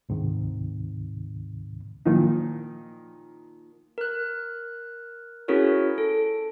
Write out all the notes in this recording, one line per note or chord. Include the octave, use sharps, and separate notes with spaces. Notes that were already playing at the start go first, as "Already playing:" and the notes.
D2 G#2 C3 D#3
A#2 D#3 F3 D#4
A#4 F#6
C#4 E4 F#4 G#4 A#4 C#5
A4